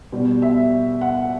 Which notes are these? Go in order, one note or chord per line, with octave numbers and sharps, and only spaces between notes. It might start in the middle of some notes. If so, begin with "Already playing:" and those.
B2 G3
E5
F#5